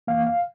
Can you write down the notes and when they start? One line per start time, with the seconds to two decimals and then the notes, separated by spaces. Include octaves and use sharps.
0.07 F2 E3 A#3 F5
0.27 F5